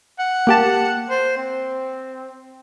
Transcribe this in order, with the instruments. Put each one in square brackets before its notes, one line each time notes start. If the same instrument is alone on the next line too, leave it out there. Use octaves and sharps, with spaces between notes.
[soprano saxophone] F#5
[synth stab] A#3 G4 A5
[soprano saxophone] C5
C4